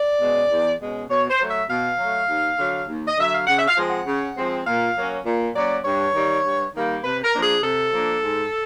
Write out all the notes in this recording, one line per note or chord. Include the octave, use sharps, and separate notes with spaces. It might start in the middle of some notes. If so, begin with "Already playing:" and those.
Already playing: D5
B2 G#3 C#4
E2
B2 G#3 C#4
B2 C#5
C5
F#3 A3
E5
B2 F5
F#3 A3
D#2
D3 F#3
D#2
D#5
D3 F#3 E5
F5
C#3 F#5
E5
F5
F3 G#3 C4
F#5
C#3
F3 G#3 C4
A#2 F5
F#3 A#3 C#4
A#2
F#3 A#3 C#4 D5
G2 C#5
D#3 G3 A#3
G2
D#3 G3 A#3
C3 B4
A#4
F3 A#3 D4
G#4
C3 A4
F3 A#3 D4
G#2